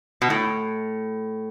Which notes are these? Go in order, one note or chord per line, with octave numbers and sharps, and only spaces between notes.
B2
A2